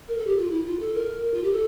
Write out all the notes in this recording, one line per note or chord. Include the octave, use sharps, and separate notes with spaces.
A#4
A4
G4
F4
E4
F4
A4
A#4
F4
G4
A4